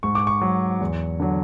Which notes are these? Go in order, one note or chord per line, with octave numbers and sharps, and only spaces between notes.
G#2 C#6
D6
C#6
F#3
E2
D3 F#3